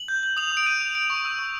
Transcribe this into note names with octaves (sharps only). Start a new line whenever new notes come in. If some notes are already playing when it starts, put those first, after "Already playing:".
Already playing: F#7
G6
G6
D#6 F7
D#6
D7
G6 D#7
G6
G6 D7
C#6
E6
C#6